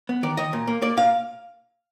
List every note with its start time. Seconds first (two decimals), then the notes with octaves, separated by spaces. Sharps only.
0.09 B3
0.23 D#3 D5
0.37 D#3 D#5
0.53 A#2
0.67 A#3
0.82 A#3 D5
0.97 A#2 F5